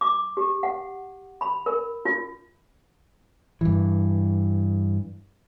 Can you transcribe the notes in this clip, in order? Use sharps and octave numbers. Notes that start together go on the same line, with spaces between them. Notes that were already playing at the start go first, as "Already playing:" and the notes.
D6
G4
F#5
B5
A#4
F4
G2 E3